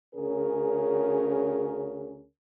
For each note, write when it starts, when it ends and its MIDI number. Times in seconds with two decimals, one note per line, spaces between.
0.15 2.24 38
0.15 2.24 49
0.15 2.24 61
0.15 2.24 68
0.15 2.24 70